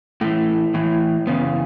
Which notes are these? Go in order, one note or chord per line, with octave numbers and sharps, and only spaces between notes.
A2 E3 A3
A2 E3
F#2 C#3 E3 B3